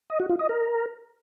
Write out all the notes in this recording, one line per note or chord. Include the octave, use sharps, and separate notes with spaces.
D#5
F#4
F4
D#5
A#4